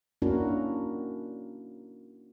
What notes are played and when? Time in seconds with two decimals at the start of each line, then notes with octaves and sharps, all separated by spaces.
0.22 A#3 C#4 D4 E4 F#4 A#4